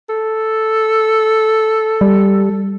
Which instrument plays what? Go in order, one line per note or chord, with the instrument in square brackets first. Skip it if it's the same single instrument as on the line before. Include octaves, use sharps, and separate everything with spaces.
[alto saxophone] A4
[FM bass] G3